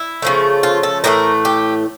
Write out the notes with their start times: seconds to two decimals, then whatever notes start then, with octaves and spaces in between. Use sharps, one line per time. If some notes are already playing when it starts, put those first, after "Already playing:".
Already playing: E4
0.22 C#3 F3 A3
0.63 F4
0.83 A4
1.04 A2 E3 A3 A#4
1.45 G4